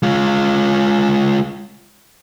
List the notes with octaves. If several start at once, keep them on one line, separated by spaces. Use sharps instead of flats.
G#3 F4